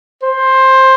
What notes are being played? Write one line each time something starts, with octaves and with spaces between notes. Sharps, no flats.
C5